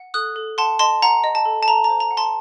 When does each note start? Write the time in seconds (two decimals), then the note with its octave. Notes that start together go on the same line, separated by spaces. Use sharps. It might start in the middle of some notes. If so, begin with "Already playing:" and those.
Already playing: F#5
0.14 A4 D#6 F#6
0.36 A4
0.58 F#5 A5 C6
0.79 D#5 A5 C6
1.02 F#5 A#5
1.24 D#5
1.35 A5
1.45 A4
1.63 A5
1.67 A4 A#5
1.84 A#5
1.90 C5
2.00 A#5
2.11 F#5
2.17 A5 C6